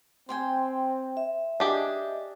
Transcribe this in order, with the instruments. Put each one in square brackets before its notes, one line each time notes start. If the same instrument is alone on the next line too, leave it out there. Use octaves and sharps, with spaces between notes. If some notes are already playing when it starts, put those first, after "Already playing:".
[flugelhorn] C4 [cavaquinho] C5 G5 G#5
[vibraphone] E5
[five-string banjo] D4 G4 G#4 [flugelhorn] D#5